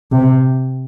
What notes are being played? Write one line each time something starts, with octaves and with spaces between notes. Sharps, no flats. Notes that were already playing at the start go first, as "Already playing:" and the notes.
C3